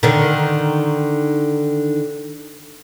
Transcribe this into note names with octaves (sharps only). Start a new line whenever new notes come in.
D3 D#3